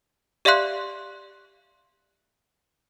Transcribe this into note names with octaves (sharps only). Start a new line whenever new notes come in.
G4 D5 E5 F5 C6 F#6